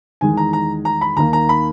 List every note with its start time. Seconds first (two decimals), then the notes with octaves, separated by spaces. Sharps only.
0.21 E2 D#3 G#3 G#5
0.37 A#5
0.53 A#5
0.85 A#5
1.01 B5
1.17 D#2 D#3 A#3 A#5
1.33 A#5
1.49 B5